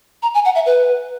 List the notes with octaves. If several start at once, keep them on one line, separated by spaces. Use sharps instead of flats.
A#5
G#5
F#5
E5
B4